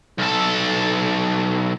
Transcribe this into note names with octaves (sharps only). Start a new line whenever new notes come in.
B1 A4